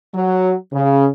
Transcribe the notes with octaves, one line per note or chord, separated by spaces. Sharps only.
F#3
C#3